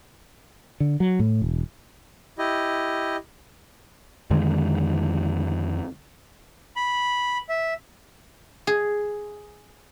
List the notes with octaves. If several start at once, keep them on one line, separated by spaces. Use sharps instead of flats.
D3
F#3
A2
E1
E4 G4 D#5
F2 D3 D#3 G#3
B5
E5
G#4